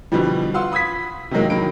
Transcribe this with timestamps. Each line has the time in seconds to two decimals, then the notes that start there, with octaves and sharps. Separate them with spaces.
0.12 B2 D3 E3 F3 G3
0.54 F4 F5 F#5 C6 E6
0.72 B5 D#6 E6 G#6 B6
1.31 C3 D#3 E3 F#3 G#3 A#3
1.50 D#3 F#3 A#3 B5 D7